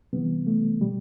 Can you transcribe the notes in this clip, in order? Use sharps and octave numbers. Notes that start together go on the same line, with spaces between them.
C3 E3 G3 B3
A3
B2 G3